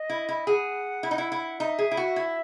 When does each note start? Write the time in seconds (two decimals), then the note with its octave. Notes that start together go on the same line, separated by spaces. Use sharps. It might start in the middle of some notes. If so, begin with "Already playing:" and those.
Already playing: D#5
0.09 E4
0.29 E4
0.47 G#4 F#5
1.03 E4
1.11 D#4
1.18 E4
1.32 E4
1.60 D#4 E5
1.79 G#4
1.91 E4
1.97 F#4
2.16 E4